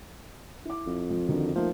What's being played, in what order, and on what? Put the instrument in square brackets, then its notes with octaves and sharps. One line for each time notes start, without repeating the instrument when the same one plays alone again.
[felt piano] E4 D6
[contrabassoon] F2
[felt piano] F3
D3 D#3 F#4
[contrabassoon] F3 [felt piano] A3 A#3 D#4